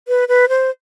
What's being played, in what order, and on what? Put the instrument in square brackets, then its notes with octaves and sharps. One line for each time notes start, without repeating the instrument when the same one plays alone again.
[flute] B4
B4
C5